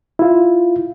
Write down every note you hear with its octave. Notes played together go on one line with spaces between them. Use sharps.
E4 F4